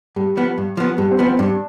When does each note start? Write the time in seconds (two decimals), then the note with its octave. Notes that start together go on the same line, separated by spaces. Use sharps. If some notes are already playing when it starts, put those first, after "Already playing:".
0.16 G2 G3
0.37 F3 B3
0.58 G2
0.77 F3 B3
0.97 G2 G3
1.11 C4
1.19 F3 B3
1.25 C4
1.38 G2 D4